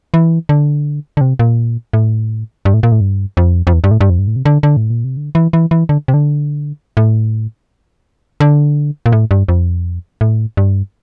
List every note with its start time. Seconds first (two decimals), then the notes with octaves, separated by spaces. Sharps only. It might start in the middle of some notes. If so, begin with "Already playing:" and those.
0.14 E3
0.49 D3
1.17 D3
1.21 C3
1.39 A#2
1.93 A2
2.65 G2
2.74 A2
2.83 A#2
2.92 A2
3.01 G2
3.37 F2
3.67 F2
3.73 E2
3.84 G2
3.91 A2
4.01 G2
4.10 F2
4.19 G2
4.27 A2
4.36 C3
4.46 D3
4.63 D3
4.77 A2
4.90 A#2
5.04 C3
5.17 D3
5.35 E3
5.53 E3
5.71 E3
5.89 D3
6.08 C3
6.14 D3
6.97 A2
8.40 D3
9.06 A#2
9.12 A2
9.31 G2
9.48 F2
10.21 A2
10.57 G2